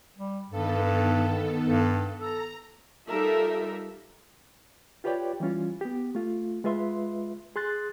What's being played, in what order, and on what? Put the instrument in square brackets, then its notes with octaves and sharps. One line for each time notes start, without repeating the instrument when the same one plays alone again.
[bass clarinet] G3
[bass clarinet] G2 [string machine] D#3 B3 A4
[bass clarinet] G2
[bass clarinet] A4 [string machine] A#5
[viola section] G3 D#4 F4 A4 A#4 E5
[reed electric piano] F4 G4 B4 C#5 D5 G5
E3 G3 C#4 F4
B3 G4
A3 F4
G#3 F4 B4 E5 C6
G#4 C6 F#6 A6